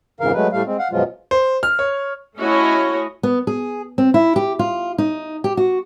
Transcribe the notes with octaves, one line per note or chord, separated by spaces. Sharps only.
F2 G#2 C#3 E3 A#4 F5
F#3 G#3 A3 B4
A2 G3 A3 F5
G#3 C4
F5 F#5
F#2 B2 F3 F#3 G#3 F4
C5
F6
C#5
A3 C#4 E4 F#4 C#5 D#5
B3
G#4
C4
E4
G4
F4
D#4
G4
F#4